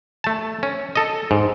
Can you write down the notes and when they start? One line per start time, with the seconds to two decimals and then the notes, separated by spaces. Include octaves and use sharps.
0.24 A3 A5
0.63 C#4
0.96 A4 D#5
1.31 G#2